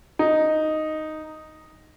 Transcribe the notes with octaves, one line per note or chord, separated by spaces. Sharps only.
D#4